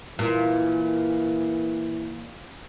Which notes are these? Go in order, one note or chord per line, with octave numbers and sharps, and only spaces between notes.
A#2 E3